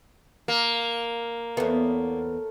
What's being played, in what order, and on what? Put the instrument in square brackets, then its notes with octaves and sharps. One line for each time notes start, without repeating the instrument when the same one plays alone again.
[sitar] A#3
[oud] E2 B3 [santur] A3 C#5